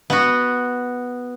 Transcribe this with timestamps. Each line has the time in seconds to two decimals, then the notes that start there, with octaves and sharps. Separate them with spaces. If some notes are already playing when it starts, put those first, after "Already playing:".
0.10 B3 F#4